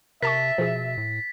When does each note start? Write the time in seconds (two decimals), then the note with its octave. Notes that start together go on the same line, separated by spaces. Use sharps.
0.23 C3 A#4 E5 A5 C#6 A6 B6
0.58 B2 F3 G#4
0.97 A2